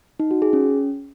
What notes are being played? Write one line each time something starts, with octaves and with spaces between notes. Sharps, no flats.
D#4
F#4
G#4
C#4